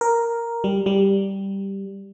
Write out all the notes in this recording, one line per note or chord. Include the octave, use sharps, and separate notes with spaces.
A#4
G3
G3